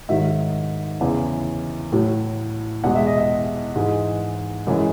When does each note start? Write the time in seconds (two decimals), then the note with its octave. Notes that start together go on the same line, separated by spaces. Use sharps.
0.09 G#2 D#3 F#3 E5
1.01 E2 C#3 E3
1.92 A2 F#3
2.84 E2 B2 G#3 F#5
2.95 E5
3.07 D#5
3.18 E5
3.75 G#2 E3 G#3
4.67 F#2 E3 G#3